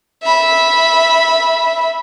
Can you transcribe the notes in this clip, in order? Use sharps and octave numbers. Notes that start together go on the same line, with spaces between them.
E5 B5